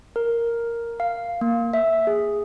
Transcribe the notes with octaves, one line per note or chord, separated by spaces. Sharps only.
A#4
F5
A#3
E5
G#4